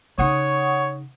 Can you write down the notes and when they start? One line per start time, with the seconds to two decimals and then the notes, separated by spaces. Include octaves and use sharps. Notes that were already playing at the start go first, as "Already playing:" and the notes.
0.18 C#3 D#4 C#5 F#5 C#6 D#6